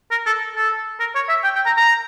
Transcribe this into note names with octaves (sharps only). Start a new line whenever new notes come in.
A#4
A4
A4
A#4
C#5
E5
G5
G5
A#5
A#5